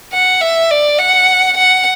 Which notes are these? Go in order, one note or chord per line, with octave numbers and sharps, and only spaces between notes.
F#5
E5
D5
F#5
F#5